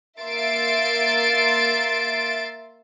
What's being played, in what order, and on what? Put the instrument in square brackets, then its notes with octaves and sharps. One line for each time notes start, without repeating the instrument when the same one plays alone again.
[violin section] A#3 E5 C6 A6 C7 D7